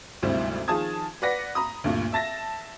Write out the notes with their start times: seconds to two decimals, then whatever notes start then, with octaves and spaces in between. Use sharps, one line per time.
0.22 G#1 D2 C3 G3 E4 C5
0.68 D#3 F3 G#4 A5 D#6 G#6
1.22 B4 D5 F#5 A#6 B6
1.55 A#5 B5 D#6
1.84 D2 G2 A#2
2.13 E5 A5 A6 A#6